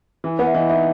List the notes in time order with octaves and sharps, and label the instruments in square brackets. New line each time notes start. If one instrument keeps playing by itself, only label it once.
[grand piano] E3
[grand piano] B3 [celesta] F#5
[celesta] E5
[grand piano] E3 [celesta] D#5
[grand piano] D#4 [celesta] E5